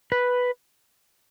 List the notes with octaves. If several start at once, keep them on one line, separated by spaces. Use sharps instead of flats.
B4